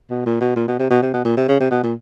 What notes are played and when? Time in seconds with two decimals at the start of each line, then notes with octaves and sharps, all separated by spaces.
0.10 B2
0.26 A#2
0.41 B2
0.56 A#2
0.68 B2
0.79 C3
0.90 B2
1.02 C3
1.14 B2
1.25 A#2
1.37 C3
1.48 C#3
1.60 C3
1.71 B2
1.83 A#2